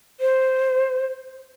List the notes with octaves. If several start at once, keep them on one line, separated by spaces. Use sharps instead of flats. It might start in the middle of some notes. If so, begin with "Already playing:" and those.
C5